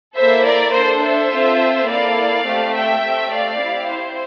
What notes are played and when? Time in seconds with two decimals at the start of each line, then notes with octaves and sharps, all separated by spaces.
0.16 A#3 E4 A4 C5 E5
0.44 A#4 D5
0.73 D4 A4 C5
1.02 C5 E5
1.30 C4 F4 A4
1.88 A#3 E4 A4 D5 F5
2.45 A3 C4 G4
2.74 E5 G5
3.03 A3 C4 G4
3.31 D5 F5
3.60 C4 E4 G4
3.89 C5